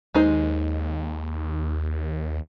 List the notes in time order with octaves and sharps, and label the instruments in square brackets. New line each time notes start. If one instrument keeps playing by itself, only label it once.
[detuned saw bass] D#2 [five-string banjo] G#3 D#4 C5